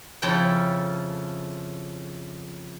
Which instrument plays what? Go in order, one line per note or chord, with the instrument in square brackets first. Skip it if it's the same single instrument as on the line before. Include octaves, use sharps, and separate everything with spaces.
[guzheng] F2 C#3 C#4 E4 A4 G5